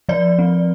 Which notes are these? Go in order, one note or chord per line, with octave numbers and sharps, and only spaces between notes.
F3 D5
C4